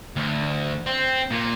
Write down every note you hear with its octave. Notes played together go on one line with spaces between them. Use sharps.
D2
C4
A#2